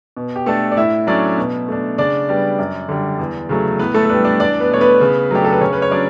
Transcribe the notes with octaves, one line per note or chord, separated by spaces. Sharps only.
B2
G4
A3 D4 A4
D5
A2 E4 E5
F#3 A3 C#4 D4 D5
B2
A3 D4
C#3 D4 D5
G3 B3 D4
F#2
D3 G3
E2
C#3 F#3 A3
A2 B3 B4
A3 A4
A4
G3 B3 D4 B4
D4 D5
E2 D4 D5
B3 B4
B2 A3 C#5
B3 B4
C#3
F#3 A3 D4 G4
A4
B4
C#3 C#4 C#5
B4
C#5
F#3 C#4 D4 D5